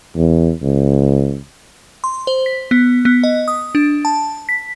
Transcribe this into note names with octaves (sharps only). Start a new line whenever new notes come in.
E2
C#2
C6
C5
B6
B3
B3
D#5
D#6
D4
A5
B6